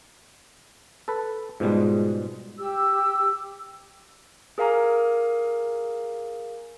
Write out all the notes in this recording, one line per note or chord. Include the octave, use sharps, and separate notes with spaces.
A4 B4
G#2 B2 G3 G#3 F4
G4 E6
G#4 A#4 F5 G#5 A#5 D6